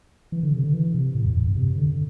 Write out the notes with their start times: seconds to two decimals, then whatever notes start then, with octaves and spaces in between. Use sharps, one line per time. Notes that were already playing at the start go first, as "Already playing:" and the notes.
0.32 E3
0.43 D3
0.53 C3
0.63 D3
0.73 E3
0.95 C3
1.15 A2
1.25 E2
1.36 E2
1.47 G2
1.56 C3
1.78 D3